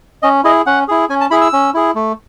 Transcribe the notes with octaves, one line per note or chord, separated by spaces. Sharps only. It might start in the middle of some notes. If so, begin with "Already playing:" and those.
C#4 D#5
E4 G#4 D#5
C#4 F#5
E4 G#4
C#4 G#5
A5
E4 G#4 B5
E6
C#4
E4 G#4
A3